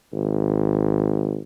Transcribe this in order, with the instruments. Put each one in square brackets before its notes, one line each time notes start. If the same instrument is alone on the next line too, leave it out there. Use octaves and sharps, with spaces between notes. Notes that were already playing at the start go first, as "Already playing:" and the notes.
[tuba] G#1